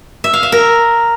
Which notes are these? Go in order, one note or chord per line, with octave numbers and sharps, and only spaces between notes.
E5
F5
E5
A#4